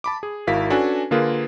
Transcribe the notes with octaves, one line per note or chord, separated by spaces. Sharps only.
A5 B5 D6
G#4
G#1 E4 F#4 A#4 F5 B6
C#4 D4 F#4 A4 B4 G#5
D3 A#3 F4 G#4 A#4 B4